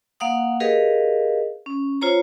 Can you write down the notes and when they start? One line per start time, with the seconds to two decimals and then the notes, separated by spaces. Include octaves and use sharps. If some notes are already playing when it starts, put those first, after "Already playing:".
0.20 A#3 F5 F#5 D#6
0.60 G4 G#4 A#4 B4 D#5 F5
1.66 C#4
2.01 F4 C5 C#5 A#5